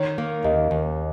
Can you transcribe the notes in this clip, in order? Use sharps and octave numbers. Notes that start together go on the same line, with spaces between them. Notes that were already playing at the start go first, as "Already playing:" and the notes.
Already playing: D#3 C#5
A#3
D#2 D#5
D#2